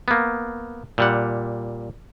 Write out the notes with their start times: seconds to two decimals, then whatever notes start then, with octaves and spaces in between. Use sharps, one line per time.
0.08 A#3 B3
0.98 A#2 G3 F#5